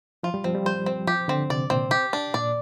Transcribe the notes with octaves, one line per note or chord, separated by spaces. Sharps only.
F3 F4
G3
F3 C4
G3
C5
C4
F3 G4
D3 C4
C3 D5
A#2 C4
G4
D4
A#2 D5